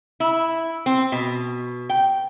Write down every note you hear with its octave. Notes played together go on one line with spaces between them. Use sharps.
E4
C4
B2
G5